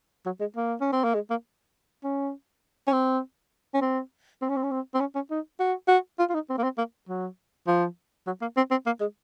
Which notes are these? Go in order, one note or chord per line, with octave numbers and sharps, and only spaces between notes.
F#3
G#3
A#3
C#4
C4
A#3
G#3
A#3
C#4
C#4
C4
C#4
C4
C4
C#4
C4
C#4
C4
C4
C#4
C#4
D#4
F#4
F#4
F4
F4
D#4
C4
A#3
C4
A#3
F#3
F3
F#3
A#3
C4
C4
A#3
G#3